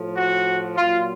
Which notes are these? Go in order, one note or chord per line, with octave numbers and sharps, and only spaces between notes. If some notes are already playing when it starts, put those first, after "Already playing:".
Already playing: A2 F3
F#4
A#2 F#3 F4